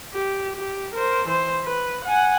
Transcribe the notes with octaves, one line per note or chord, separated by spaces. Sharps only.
G4
G4
A#4 C5
E3 C5
B4
F#5 G#5